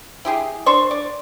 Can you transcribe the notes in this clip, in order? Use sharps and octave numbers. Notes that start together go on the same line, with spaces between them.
E4 G4 G#4
D4 C5 C#6
D5